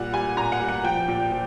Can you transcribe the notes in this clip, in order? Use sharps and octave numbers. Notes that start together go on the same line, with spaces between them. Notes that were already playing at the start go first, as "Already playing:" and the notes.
Already playing: A#2 G3 F#5
G3 G#5
A#2 A#5
F#5
G3
F#5
F3 G5
A#2
F3